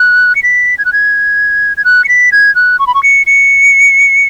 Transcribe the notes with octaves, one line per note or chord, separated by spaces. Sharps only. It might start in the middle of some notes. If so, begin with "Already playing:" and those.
Already playing: F#6
C#7
B6
G#6
F#6
G#6
G#6
F#6
C#7
B6
G#6
F#6
C#6
B5
C#6
C#7
C#7